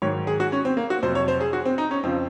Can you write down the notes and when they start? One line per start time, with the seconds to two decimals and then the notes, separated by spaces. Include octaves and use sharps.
0.02 G#2 D#3 F#3 C#5
0.27 G#4
0.40 F#4
0.52 C#4
0.65 C4
0.77 A#3
0.90 F#4
1.02 F2 C3 F#3 C5
1.15 C#5
1.28 C5
1.41 G#4
1.53 F#4
1.65 C4
1.78 D#4
1.91 C#4
2.03 F2 C#3 F3 C4